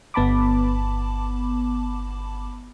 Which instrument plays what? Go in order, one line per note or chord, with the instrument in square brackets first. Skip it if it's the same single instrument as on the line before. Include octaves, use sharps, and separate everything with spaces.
[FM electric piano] G1 B3 A5 B5 D6